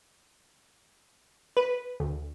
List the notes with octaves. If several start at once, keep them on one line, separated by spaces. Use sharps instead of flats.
B4
D2